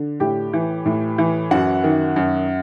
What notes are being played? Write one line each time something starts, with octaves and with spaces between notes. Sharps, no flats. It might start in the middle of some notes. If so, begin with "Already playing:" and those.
Already playing: D3
A2 G4 G5
E3
A2
E3
F#2 F#4 F#5
D#3
F#2